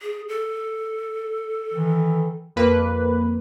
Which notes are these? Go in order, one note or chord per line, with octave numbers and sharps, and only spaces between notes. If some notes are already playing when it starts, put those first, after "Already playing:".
G#4
A4
D#3 E3
F2 A#3 B4